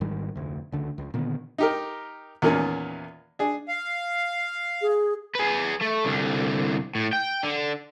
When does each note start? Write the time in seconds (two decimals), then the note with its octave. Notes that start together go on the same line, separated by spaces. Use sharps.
0.01 G#1 G#2 D#3 G3
0.36 F1 D2
0.72 C#2 D3
0.98 C#2
1.14 A#2 D3 D#3 B3
1.58 D#4 G4 A#4
2.42 E2 A#2 D#3 A#3 C#4
3.39 D4 G#4
3.68 F5
4.81 G#4
5.35 G#4 B4
5.81 A3
6.05 C2 D3
6.95 A2
7.13 G5
7.43 D3